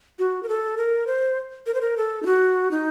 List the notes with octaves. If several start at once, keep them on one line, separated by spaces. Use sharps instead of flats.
F#4
A#4
A4
A#4
C5
A#4
C5
A#4
A4
D#4
F#4
D#4